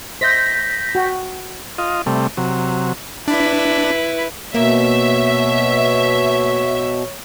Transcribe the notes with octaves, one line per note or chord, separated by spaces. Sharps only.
C5 D#5 E5 G6 A#6 B6
F#4 G5
F4 D#5
C3 G3 A3
C3 F#3
D4 E4 B4
B2 A#3 C#5 E5